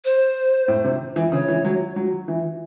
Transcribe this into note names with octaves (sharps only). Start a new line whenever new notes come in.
C5
A2
C3
E3
C#3 C#5
E3
F#3
F#3
E3